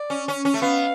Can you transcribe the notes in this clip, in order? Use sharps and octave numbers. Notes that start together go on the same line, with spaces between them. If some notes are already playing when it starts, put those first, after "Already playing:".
Already playing: D5
C#4
C#4
C#4
A3
B3 F5